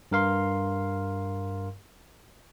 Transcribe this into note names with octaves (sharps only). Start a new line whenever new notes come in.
G2 A#4 F5 C6